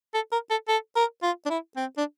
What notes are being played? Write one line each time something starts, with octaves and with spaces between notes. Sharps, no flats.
A4
A#4
A4
A4
A#4
F4
D4
E4
C4
D4